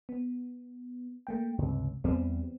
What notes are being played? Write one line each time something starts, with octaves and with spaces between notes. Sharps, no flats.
B3
A3 A#3 G5
C#2 G2 C3
E2 G3 B3 C4